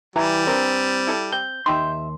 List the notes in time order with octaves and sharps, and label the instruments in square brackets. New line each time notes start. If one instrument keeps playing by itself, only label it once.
[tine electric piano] E3 [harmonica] G3 [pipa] E4 A#5
[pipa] E3 D4 A#4 [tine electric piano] C4
[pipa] E4 A4 A5
[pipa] C4 [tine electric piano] G6
[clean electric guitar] D#2 C6 [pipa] D#4 G4 E5